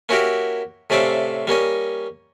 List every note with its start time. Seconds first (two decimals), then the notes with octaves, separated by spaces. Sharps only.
0.09 A#3 C#4 E4 F#4 G4 A#4
0.90 A2 C3 C#4 D5 E5 F5
1.47 G3 A#3 C#4 D#5